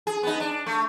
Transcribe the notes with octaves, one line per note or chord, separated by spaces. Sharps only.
G#4
B3 D#4
D4
A3